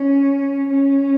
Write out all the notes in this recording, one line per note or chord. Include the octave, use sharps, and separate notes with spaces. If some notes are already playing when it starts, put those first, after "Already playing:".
Already playing: C#4
C#4